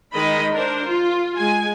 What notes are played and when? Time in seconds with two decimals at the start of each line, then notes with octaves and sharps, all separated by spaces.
0.14 D#3 G#3 D#4 D#5 B5
0.51 D4 A#4 C5
0.86 F4
1.37 G#3 G#5